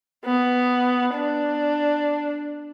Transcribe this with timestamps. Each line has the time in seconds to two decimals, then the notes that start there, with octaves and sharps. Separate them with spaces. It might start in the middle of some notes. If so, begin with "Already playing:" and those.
0.25 B3
1.14 D4